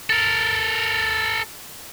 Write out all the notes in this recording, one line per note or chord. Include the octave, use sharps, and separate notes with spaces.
A4 A#4